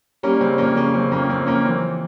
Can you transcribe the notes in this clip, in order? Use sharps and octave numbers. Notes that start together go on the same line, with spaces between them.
G3 A#3 C#4
C#3 C4
F2 A#3 C#4
C#3 A#3 C#4
C#3 C4
F2 A#3 C#4
F2 C4
F2 A#3 C#4
E3 C4